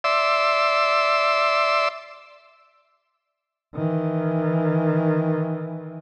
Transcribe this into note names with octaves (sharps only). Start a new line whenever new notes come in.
D5 E5 C6 E6
D#3 E3